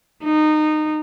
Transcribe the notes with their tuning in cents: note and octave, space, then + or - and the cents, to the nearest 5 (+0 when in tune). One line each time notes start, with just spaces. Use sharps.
D#4 -20